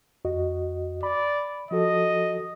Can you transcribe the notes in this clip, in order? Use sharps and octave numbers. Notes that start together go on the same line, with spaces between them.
F2 F#4 D#5
D5 B5
F3 F#4 A4 D#5